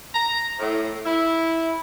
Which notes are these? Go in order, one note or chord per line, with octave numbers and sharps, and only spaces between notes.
A#5
A2
E4